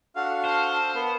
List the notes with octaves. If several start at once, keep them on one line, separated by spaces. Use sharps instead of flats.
D4 F#4 A4 F5 F#5
C5 A5
B3 A#4